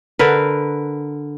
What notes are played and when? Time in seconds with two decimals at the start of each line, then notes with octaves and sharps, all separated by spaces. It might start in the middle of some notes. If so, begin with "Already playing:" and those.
0.19 D3 A#4 B4